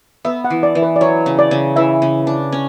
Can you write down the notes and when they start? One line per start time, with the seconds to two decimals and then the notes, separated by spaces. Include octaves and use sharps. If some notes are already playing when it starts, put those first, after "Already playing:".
0.25 B3 E5
0.44 F#5
0.50 E3
0.63 D5
0.75 E3
0.82 B4
0.96 D5
1.01 F#3 C#5
1.26 C#3
1.39 D5
1.51 C#3
1.76 E3 E5
2.02 C#3
2.27 D4
2.52 C#4